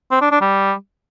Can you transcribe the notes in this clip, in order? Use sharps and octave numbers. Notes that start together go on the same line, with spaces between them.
C4
D4
D4
G3